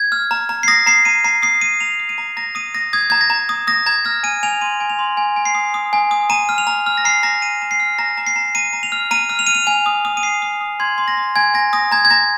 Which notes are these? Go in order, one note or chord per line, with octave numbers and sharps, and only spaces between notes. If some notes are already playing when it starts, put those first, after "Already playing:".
Already playing: G#6
F6
A#5
A#5
C7
D#6 A#6
A#5 C7
A#5 D#7
A#5 C7
D#6 C7
D#6 D#7
A#5 F7
D#6
D#7
A#5
A#5 A#6
D#6 D#7
D#6 A#6
D#6 G#6
A#5 G#6
A#6
A#5
D#6
D#6 A#6
A#5 G#6
F6 A#6
G#5 D#7
G#5 F7
C6 D#7
G#5
F7
C6
G#5
G#5
C7
D#6
D#6
G#5
D#6
A#5 D#7
F6
F7
A#5
F6
A#6
A#5 C7
A#5 A#6
A#5 D#7
A#5
C7
F6
A#5 A#6
A#5
C7
A#5
A#5 D#7
A#5
F7
F6
A#5 D#7
F6
F7
F6 D#7
F7
G#5 F7
D#6
D#6
D#7
D#6 C7
D#6
D#6
C6 G#6
C6
A#6
C6
G#5 G#6
G#5 A#6
D#6 A#6
A#5 G#6
G#6
A#5 A#6